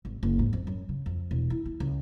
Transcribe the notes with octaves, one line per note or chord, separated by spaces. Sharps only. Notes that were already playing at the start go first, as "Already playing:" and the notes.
G#1
F#1
G#2
F2
F#2
C#3
F2
E1
E4
E4
C#2